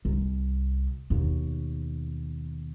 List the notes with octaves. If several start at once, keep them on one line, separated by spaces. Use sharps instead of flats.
C2
D#2 B2